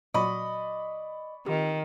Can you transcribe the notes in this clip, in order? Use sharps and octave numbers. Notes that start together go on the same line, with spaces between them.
A#2 F#3 F#4 D5 D#5 B5 C#6
D#3 C4 F4 G4